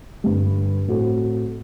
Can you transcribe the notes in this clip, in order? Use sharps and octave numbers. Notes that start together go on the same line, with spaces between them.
G2 D3 G3
A2 A3 C4 F#4